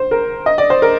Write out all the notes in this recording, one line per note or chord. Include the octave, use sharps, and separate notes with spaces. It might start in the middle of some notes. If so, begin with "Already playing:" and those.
Already playing: C5
A#4
D#5
D5
C5
A#4